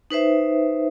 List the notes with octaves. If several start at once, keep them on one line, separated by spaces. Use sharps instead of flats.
D#4 B4 C5 E5